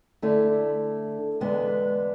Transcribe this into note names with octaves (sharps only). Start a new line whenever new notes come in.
D3 A3 E4 A4 D5
E2 D3 G#3 B3 D4